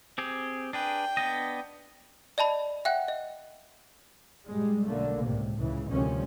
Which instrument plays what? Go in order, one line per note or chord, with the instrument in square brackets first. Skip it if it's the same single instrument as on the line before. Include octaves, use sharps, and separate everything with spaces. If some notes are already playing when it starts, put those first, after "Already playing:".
[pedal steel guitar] C4 G4 G#4
[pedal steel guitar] D4 G#4 B4 [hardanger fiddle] G5
[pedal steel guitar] B3 D4 D#5
[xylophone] D5 D#5 A5 B5
E5 F#5 G5 F#6
D#5
[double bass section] G2 A#2 G3 G#3
B1 D3 A3 A#3
C#2 A2 C3
C#2 C#3 E3
D2 C3 D#3 F3 G3 C#4